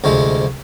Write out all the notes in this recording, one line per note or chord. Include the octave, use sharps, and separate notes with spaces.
D2 C3 F3 G#3